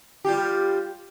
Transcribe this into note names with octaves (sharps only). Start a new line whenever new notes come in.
G3 F4 G4